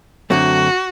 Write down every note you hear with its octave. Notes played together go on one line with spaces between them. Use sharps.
F#2 D3 F#3 A3 C4 F#4